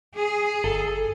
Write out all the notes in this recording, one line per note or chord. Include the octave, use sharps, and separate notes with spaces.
G#4
G1 A4